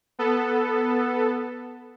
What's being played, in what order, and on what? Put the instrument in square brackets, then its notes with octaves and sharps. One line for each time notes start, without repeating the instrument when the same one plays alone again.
[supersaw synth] B3 A4